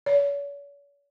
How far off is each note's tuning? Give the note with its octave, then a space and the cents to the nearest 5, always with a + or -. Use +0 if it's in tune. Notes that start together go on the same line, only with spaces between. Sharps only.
C#5 +45